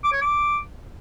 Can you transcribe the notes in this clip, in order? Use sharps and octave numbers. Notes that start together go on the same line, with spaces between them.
D6
C#5
D6